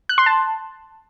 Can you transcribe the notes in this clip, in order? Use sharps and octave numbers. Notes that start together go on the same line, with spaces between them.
F#6
C6
A5